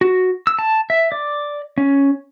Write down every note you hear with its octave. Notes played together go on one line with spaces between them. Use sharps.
F#4
E6
A5
E5
D5
C#4